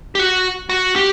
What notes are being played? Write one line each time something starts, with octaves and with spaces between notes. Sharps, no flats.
G4
F#4
F#4
G4